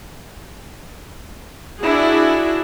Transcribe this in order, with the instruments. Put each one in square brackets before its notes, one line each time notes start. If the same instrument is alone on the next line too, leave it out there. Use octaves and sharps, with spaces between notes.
[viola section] D4 E4 F#4 G#4